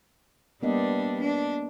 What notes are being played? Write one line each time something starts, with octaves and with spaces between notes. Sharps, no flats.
G3 A#3 B3 D4 D#5
D4